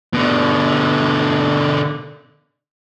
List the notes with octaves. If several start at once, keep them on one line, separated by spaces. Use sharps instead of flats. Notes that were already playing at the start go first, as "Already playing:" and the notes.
B2 D3